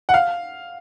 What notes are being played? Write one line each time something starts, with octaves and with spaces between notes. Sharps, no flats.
F#5
F5